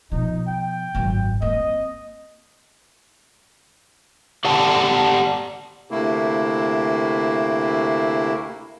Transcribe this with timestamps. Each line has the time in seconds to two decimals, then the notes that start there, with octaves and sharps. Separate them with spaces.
0.12 B2 F3 D#4
0.47 G5
0.95 G#1 F#2
1.42 A#3 C4 D#5
4.45 G4 D5 F#5 G5 A5
5.91 D2 C3 A3 A#3 E4